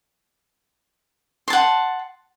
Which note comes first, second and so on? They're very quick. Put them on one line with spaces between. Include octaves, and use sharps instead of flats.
C6 A5 F#5